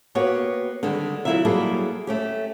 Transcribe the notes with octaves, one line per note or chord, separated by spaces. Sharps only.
A#3 B3 F#4 G4 C#5
D3 D#3 G3 G#3
C#3 F#3 E4 F4 A#4 E5
F#3 G3 A#3 E4 G#4 A4
A3 C#4 G4